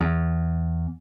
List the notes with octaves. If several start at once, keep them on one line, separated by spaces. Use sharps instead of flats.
E2